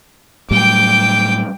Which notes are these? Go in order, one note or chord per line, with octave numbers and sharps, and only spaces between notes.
A2 F#3 G3 G5 D6